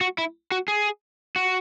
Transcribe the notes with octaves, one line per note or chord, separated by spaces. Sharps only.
F#4
E4
F#4
G#4
F#4